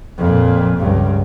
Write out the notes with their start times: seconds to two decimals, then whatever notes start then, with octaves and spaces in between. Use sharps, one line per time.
0.18 F2 A#2
0.77 C#2 G2